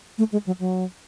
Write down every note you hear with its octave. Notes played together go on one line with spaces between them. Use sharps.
A3
G#3
F#3
F#3